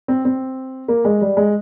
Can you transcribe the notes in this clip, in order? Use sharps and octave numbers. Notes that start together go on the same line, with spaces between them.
C4
C4
A#3
G#3
G3
G#3